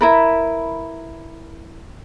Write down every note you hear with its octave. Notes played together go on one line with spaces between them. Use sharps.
E4 A#4 B4